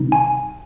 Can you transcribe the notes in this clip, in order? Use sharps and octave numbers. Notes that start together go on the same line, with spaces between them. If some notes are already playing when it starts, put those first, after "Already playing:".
Already playing: C3 D#3 G3 C4 D#4
G#5